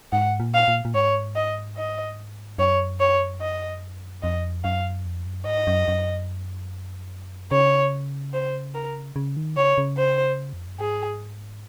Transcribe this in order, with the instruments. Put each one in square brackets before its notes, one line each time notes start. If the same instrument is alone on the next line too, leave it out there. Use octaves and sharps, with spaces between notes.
[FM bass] G#2 [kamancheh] F#5
[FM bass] A#2
[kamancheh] F5
[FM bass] A#2
A#2
[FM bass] G#2 [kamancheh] C#5
[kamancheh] D#5
D#5
[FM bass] F#2 [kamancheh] C#5
[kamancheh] C#5
D#5
[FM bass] F2 [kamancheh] D#5
[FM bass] F#2 [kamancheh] F5
[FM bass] F2
F#2
[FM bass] G#2 [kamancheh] D#5
[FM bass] F#2
F#2
[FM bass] C#3 [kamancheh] C#5
[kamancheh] C5
A#4
[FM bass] C#3
D#3
[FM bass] C#3 [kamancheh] C#5
[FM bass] C#3
[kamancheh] C5
[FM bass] F2
F#2
[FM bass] G#2 [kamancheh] G#4